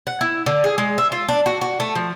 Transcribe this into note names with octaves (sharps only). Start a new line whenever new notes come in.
F#5
E4
D3
G#4
G#3
E5
F4
D4
F#4
F#4
A3
F3